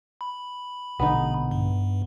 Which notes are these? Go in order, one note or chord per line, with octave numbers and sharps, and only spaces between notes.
B5
A#1 B2 D3 B3 D#4
G2